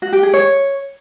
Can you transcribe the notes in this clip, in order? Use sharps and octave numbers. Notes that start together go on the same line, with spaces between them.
F#4
G4
G#4
C#5